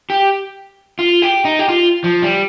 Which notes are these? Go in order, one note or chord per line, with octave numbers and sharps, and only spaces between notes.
G4
F4
G4
D#4
G4
F4
F3
G3